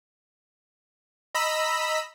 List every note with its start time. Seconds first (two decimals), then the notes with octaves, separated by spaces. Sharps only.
1.35 D#5 A#5 B5 E6 B6